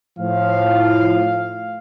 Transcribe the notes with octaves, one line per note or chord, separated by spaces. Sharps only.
A2 F3 F5